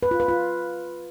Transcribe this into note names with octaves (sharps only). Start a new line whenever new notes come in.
B4
F4
B4
F4